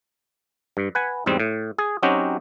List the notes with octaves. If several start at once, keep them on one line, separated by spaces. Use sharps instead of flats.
G2
B4 F#5 G#5
E2 G#2 G3 C4
A2
G#4
F#3 C4 C#4 D#4 F#4 G4